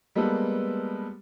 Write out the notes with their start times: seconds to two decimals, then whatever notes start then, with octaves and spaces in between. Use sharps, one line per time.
0.16 G3 G#3 A#3 B3 A4 B4